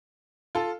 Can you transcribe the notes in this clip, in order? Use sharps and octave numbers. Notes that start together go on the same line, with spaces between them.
F4 A4